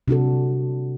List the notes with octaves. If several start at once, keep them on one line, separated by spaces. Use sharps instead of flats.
C3 D4 F#4 A4